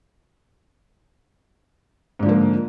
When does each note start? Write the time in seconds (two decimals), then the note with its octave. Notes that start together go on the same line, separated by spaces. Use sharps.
2.19 G#2
2.23 D3
2.26 F3
2.29 A#3